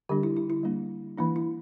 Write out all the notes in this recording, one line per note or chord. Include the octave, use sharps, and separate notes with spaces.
D3 G3 D4 G4
E4
E4
E4
G3 A#3 D4
E3 A#3 D4 E4
E4